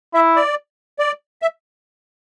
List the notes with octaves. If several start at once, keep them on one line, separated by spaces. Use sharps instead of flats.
E4 E5
D5
D5
E5